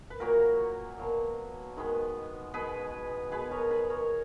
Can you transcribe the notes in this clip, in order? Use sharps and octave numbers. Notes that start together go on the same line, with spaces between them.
B4
A#2 F#3 A#3 F#4 A#4
B2 F#3 A#3
D#3 G#3 B3
B2 G#3 B3 G#4 B4
B2 G#3 B3 G#4 B4
A#4 C#5
G#4 B4
A#4 C#5